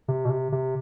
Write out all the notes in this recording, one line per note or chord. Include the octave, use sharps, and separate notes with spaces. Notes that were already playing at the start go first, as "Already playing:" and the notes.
C3
B2
C3
C3